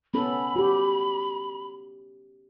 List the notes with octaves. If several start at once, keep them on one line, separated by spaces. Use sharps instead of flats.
B3 C#4 A4 B5
F#4 G4